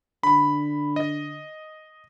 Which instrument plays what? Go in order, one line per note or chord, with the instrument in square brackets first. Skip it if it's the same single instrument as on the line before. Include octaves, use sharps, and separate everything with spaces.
[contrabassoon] D3 [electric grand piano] B5
[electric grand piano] D#5